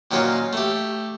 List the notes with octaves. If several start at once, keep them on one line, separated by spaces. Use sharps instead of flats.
A#2 D#3 F#3 C#4 F4
A3 G4